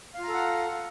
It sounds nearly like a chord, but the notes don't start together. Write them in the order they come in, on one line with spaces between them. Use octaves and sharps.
F5 F4 A#5 A4 F#5